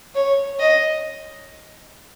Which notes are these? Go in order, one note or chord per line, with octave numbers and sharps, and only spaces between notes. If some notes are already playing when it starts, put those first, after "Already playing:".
C#5
D#5